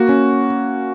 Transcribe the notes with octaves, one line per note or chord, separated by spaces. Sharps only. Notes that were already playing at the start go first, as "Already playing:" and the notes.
Already playing: A#3 F#4
C#4